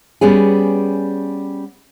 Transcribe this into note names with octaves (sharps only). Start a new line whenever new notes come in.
G3 B3 C#4 G#4